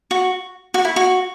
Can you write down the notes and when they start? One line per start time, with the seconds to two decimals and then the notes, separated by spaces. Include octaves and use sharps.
0.11 F#4
0.74 F#4
0.85 E4
0.96 F#4